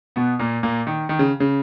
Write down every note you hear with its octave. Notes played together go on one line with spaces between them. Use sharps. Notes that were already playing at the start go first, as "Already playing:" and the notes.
B2 B3
A#2 A#3
A#2 A#3
D#3
D#3
C#3
C#3